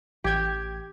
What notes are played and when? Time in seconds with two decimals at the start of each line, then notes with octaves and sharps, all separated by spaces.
0.24 A1 G4 G5 G#6